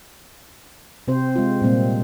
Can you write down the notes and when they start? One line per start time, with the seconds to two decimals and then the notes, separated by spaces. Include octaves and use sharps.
1.08 C3 C4 C5
1.36 G#3 F4
1.62 A#2 G3 A#3 C4